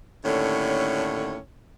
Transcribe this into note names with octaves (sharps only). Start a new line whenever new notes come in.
D#2 A2 D3 C#4 C#5